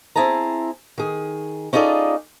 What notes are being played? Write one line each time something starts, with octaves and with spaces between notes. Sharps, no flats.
C4 E4 G#4 A5 A#5
D#3 G#4
C#4 D#4 F4 G#4 A4 D5